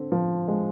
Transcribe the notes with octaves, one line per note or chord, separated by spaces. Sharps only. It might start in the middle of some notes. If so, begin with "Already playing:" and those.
Already playing: D3 C4
F3
G#3